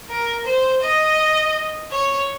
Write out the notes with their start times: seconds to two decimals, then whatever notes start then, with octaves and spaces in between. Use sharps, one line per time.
0.09 A#4
0.46 C5
0.82 D#5
1.92 C#5